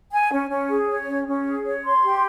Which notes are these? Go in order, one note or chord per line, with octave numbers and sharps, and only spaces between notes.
G#5
C#4
C#4
G#4
C#5
C#4
C#4
G#4
C#5
C6
G4